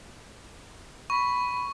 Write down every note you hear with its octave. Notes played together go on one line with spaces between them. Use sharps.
B5 C#6